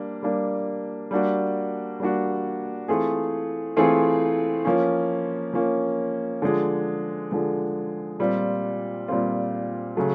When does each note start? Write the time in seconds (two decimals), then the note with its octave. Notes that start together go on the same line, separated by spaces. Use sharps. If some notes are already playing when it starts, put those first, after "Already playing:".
Already playing: G3 A#3 D4
0.23 G3 A#3 D4
1.11 G3 A#3 D4 F#4
2.00 G3 A#3 D4 F#4
2.88 E3 A3 C4 F4 G#4
3.77 E3 A3 C4 F4 G#4
4.65 F3 A#3 C#4
5.54 F3 A#3 C#4
6.42 D3 F3 G#3
7.31 D3 F3 G#3
8.19 A#2 G3 C4 F4
9.08 A#2 G3 C4 F4
9.97 C#3 F#3 A3